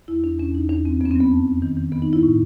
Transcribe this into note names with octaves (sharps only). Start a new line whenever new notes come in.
E2 E4
E2 D4
E2 C#4
E2 D#4
E2 D4
E2 C4
F2 B3 C#4
C4
F#3 B3
F2
F2
D#3
D#3
D#3 B3
D#4
G2 E4
A2 D#4